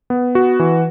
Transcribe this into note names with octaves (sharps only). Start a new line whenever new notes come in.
B3
F#4
E3